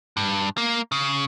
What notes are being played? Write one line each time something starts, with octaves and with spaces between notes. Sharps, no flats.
G2
A#3
C#3